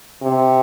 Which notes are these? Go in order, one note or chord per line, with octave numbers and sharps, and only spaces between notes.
C3